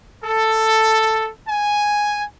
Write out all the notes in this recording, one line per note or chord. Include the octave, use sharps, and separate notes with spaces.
A4
G#5